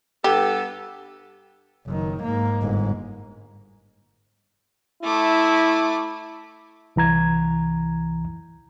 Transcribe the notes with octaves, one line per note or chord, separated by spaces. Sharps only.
G2 B3 G4 A4
F#1 D#3
G#2 A#3
G1 G#2
A3 E4 D6
C2 E3 A#5 G#6